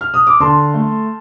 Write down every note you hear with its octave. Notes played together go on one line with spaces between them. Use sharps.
F6
D#6
D6
D3 A5 C6
A3